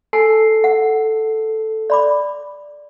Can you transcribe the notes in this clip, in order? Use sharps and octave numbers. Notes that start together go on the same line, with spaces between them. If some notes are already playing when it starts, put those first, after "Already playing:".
A4 G#5 A5 C7
F#5
D5 B5 D6